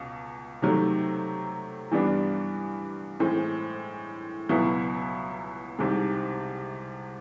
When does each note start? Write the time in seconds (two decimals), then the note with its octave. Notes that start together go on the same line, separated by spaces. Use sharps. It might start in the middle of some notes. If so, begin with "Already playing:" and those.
Already playing: C#2 B2
0.62 C3 D#3 F#3 A3
1.92 G2 E3 G3 B3 D4
3.20 A2 E3 G#3 C4
4.49 C#2 B2 F#3 B3 E4
5.79 C2 C3 D#3 G#3